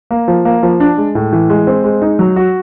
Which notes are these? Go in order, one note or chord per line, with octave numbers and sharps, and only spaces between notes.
A#3
F3
A#3
F3
D4
G#3
A2
E3
G#3
C4
G#3
D#4
F#3
F#4